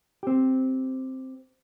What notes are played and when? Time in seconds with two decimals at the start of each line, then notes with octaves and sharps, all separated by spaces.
0.23 C4 G4